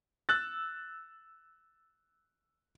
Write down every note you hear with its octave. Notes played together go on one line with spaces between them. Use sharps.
E6 F#6 A6